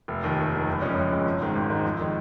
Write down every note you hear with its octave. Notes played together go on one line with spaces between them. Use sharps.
F1
D#2 D#3
F1
D#2 D#3
F#1
F2 C#3 G#3 C#4
F#1
F2 C#3 G#3 C#4
G#1
G#2 D#3 G#3 C4
G#1
G#2 D#3 G#3 C4
F2
D#3 G#3